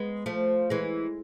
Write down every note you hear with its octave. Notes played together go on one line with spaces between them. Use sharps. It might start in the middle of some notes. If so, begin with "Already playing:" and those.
Already playing: G#3 B3
F3 A3
E3 G#3